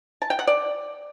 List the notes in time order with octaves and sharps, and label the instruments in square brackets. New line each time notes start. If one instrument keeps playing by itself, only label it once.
[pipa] A5
G5
F#5
D5